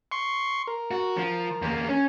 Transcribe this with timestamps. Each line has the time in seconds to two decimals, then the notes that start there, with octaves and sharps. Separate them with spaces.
0.12 C6 C#6
0.68 A#4
0.91 F#4
1.17 F3
1.62 E2 A#3
1.89 C#4